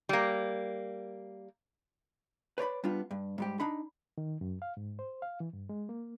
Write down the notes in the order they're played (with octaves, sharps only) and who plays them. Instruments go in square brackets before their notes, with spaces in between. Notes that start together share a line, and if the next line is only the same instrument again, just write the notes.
[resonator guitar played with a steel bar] G3 A#3
[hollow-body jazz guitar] B4 C#5 D5 B5
G3 B3 D4 F4
G2
G#2 G3 G4
D4 D#4 B5
[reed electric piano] D#3
F#2
F5
G#2
C5
F5
E3
G2
G#3
A#3